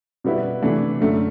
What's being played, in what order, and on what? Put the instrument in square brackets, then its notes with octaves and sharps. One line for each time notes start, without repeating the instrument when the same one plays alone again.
[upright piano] B2 G3 B3 E4
C3 E3 A3 D4
F#2 D3 A3